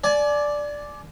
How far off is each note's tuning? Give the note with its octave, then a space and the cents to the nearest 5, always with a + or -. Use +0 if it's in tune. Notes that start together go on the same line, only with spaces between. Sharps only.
D5 +0 G#5 +35